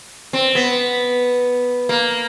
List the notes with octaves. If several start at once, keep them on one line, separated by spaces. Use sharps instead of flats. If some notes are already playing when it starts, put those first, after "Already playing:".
C4
B3
A#3